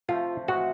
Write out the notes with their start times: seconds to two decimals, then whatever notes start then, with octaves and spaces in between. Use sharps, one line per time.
0.08 C3 F3 A3 F4
0.48 A2 E3 G#3 F#4